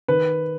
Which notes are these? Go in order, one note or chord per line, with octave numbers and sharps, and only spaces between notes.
D#3 B4